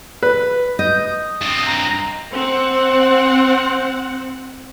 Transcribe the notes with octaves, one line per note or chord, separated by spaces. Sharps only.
B4
D#5 G6
D#6
G2 C4
A#5
C4 F#5